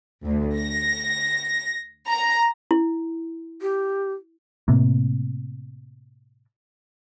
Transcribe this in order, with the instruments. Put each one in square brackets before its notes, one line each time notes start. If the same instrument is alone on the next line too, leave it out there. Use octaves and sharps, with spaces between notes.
[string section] D2
A#6
A#5
[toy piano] E4
[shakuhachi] G4
[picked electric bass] A2 C3 A#3